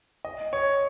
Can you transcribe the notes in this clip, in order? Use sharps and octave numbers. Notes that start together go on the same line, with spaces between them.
D#5
C#5